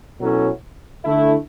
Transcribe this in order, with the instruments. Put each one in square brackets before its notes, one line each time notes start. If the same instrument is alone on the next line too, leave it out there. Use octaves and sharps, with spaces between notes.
[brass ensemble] B2 F#3 C#4 E4 A4
D3 A3 E4